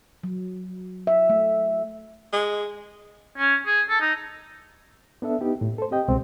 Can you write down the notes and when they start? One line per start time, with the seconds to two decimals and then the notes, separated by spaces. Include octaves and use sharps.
0.24 F#3
1.07 E5
1.30 A3
2.32 G#3
3.38 C#4
3.66 G#4
3.89 A4
4.01 D#4
5.22 B3 D4 A4 E5
5.41 B3 D#4 G4
5.61 A2
5.78 A4 C5
5.91 C4 G4 D#5 G5
6.08 C2 B2 G#3 C4